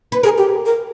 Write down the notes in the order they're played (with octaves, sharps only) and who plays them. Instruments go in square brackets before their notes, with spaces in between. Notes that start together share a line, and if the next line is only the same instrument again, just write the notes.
[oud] B4
[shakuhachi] G#4 [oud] A#4
[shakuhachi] G4
A#4